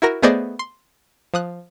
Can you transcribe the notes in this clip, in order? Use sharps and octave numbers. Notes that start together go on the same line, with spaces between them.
E4 F#4 A#4 A#6
A3 B3 G#4 C5 D5 D#5
C6
F3 D#6 F#6